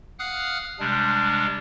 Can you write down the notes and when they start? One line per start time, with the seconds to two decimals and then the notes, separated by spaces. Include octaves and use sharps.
0.19 F5 F#5 D#6 F6 F#6
0.80 C3 G3 G#3 D4